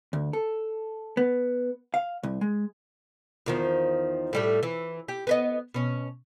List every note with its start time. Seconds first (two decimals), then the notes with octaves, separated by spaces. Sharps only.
0.13 D2
0.33 A4
1.17 B3
1.94 F5
2.23 C2
2.41 G#3
3.46 E2 D#3 F3
4.33 A2 G3 A3
4.63 E3
5.08 G4
5.27 B3 B4 D#5
5.74 B2 C#4